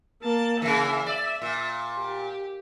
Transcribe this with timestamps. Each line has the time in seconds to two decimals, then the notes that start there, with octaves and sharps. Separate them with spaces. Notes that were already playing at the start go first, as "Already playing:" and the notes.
0.22 A#3 A5
0.62 C#3 E3 E5
1.06 D5
1.42 A#2
1.98 G4